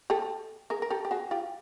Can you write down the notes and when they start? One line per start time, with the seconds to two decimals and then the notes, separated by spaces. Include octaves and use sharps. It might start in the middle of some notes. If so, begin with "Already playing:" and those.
0.10 G4 A4
0.70 G#4 A#4
0.82 A#4
0.90 G4 A4
1.05 G4
1.11 F#4 G#4
1.31 F4 G4